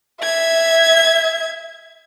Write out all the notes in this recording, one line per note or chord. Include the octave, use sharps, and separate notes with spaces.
E5 G#6